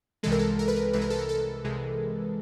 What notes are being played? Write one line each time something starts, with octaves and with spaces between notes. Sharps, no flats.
C2 C3 E3 G#3 A4
A#4
A4
A#4
B4
A#4
C2 C3 E3 G#3 B4
A#4
A4
A#4
A4
C2 C3 E3 G#3 G#4